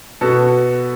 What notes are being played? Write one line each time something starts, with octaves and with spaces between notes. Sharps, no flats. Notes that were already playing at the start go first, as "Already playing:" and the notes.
B2 B3 F#4 A4